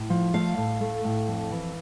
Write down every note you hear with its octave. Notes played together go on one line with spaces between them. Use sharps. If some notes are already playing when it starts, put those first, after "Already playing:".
Already playing: A2
F3
A3 F5
A2
A3
A2
F2
E3